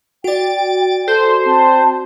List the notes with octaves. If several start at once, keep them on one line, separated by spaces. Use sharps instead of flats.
F#4 D5 G5 A6 D7
A4 C5
C4 A5